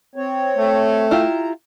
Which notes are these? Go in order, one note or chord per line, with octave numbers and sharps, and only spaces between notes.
C4 C#5
A3
E4 F4 G4 A#5